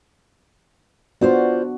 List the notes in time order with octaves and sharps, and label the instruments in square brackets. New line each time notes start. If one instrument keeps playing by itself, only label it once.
[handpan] B3 D4 F#4 [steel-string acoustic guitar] F4 C5 D5